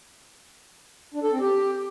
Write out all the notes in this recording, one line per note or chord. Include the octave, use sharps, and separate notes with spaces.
D4
A4
C4
G4